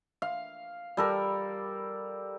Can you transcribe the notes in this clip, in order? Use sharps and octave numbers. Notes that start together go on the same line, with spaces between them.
F5
G3 A4 A#4